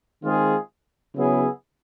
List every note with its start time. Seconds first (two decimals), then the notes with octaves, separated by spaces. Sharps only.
0.23 D#3 G#3 C4 F4 G#4
1.15 C#3 F#3 B3 E4 G#4